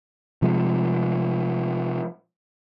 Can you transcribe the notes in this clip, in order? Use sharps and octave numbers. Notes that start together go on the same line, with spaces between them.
C3 F3 G#3